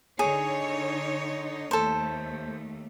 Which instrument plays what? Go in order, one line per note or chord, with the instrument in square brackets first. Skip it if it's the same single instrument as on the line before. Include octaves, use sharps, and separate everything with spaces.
[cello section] D3 D#4 C#5 [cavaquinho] G#4
[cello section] D#2 A3 [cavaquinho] A4 C5